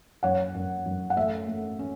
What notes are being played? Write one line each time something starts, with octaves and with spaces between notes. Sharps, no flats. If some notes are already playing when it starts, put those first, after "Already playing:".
F#2 C#5 F#5
F#2
F#2
F#5
A3 E5
A3
C#4